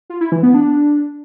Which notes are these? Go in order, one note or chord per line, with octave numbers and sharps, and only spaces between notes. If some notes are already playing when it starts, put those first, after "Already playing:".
F4
E4
E3
B3
D4